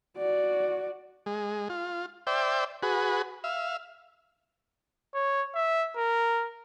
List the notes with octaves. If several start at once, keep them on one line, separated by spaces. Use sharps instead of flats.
F#4 D5
G#3
F4
C5 D5 E5 G5
F#4 G#4 B4
E5 F5
C#5
E5
A#4